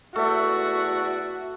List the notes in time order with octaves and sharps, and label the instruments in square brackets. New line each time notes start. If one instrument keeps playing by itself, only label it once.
[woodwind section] E2 D5 E5 [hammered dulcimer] A3 [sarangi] F#4